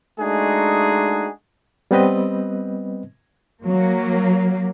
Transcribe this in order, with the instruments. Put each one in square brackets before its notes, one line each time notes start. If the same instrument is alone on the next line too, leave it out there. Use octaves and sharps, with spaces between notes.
[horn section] G#3 A3 D4 D#4 F#4 G#4
[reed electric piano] G3 B3 C4 B4 D#5
[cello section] F#3 A#3